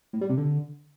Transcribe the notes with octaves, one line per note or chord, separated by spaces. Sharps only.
A2
G3
C3
D3